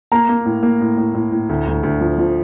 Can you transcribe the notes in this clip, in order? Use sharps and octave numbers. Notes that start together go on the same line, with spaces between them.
A#3 A#5
A#3
A2
A#3
A2
A2
A2
A2
D2
D2
D2
F3
F3